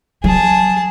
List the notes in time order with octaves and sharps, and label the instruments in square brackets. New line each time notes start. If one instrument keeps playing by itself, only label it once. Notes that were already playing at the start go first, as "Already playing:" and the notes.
[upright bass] F#3 [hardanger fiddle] G#4 A5